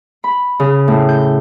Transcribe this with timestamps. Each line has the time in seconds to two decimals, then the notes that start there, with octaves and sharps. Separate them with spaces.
0.24 B5
0.60 C#3
0.88 A2
1.09 G6